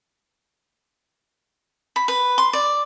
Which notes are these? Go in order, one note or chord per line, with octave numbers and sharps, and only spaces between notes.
B5
B4
C6
D5